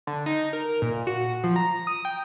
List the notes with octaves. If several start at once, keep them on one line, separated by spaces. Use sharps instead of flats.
D3
D#4
A#4
A#2
F#4
F3
A#5
D#6
G5